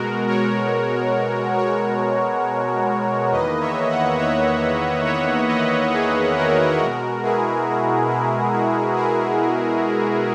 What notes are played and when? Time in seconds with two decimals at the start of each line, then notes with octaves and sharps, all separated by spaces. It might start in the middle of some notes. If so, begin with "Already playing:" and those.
Already playing: B2 G#3 F#4 A#4
0.28 A#4 C#5
1.58 A#4 C#5
3.32 E2 D#3 A#3 B4 D#5
3.60 C#5 E5
3.90 D#5 F#5
4.19 C#5 E5
5.05 C#5 E5
5.48 B4 D#5
5.92 G#4 B4
6.35 F#4 A#4
6.79 B2 G#3 F#4 A#4
7.23 E4 G#4
7.66 F#4
8.10 E4
8.53 F#4
8.96 E4 G#4